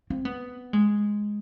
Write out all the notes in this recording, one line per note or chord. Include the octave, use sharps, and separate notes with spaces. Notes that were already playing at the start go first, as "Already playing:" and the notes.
C4
B3
G#3